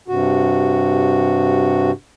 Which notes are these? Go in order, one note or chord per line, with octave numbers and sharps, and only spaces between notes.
G2 C3 F#4